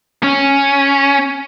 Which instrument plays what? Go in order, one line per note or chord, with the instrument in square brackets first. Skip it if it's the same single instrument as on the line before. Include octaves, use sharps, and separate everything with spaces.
[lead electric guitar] C#4